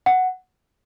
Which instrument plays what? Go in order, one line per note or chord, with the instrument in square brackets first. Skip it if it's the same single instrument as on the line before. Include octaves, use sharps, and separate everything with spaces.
[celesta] F#5